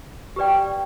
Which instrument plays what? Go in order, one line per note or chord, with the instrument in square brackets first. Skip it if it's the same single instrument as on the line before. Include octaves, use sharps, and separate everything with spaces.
[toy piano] G4 B4 D5 G5